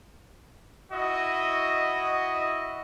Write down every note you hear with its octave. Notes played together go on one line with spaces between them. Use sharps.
E4 F#4 D#5